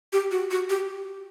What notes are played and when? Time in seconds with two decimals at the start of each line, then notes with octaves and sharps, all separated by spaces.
0.13 G4
0.31 F#4
0.51 F#4
0.69 G4